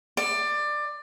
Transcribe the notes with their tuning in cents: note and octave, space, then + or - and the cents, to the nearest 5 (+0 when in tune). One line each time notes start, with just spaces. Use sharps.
D5 +20